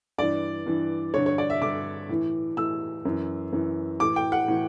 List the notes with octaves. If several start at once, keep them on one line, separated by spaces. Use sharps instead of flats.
G2 E3 D5
G2 E3
G2 D3 C#5
C#5
D5
E5
G2 D3 D6
A2 E3
A2 E3 E6
F#2 E3
F#2 E3
A2 E3 D6
G5
F#5
A2 E3